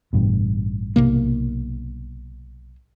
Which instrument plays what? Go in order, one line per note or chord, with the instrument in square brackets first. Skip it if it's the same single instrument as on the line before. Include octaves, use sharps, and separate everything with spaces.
[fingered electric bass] A1 G2 B2
[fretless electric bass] B1 C3 A#3